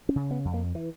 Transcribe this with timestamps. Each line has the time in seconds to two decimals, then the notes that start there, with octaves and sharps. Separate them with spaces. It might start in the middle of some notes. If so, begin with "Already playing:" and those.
0.09 C#4
0.16 C#3
0.31 B3
0.45 F2
0.54 A#3
0.75 E3